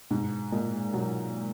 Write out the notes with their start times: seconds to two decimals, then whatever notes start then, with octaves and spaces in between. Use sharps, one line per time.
0.11 G#2 B2
0.52 A#2 G#3
0.94 B2 F#3